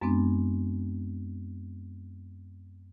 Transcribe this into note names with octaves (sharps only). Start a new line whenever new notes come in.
F#2 G#3 B3 C4 D4